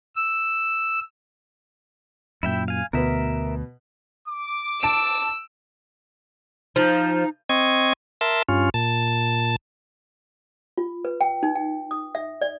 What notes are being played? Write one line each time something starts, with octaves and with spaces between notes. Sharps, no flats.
E6
F#2 A#2 E4 E5 G5
F5 G#5
D2 B2 A#4 B4 E5
D6
A5 E6 D7 E7
F3 D#4
C4 D#5 C#6 G#6
A#4 E5 A5 C6
G2 C#4 F4
A#2 A5
F4
B4
G5
D#4
G5
D#6
E5
D5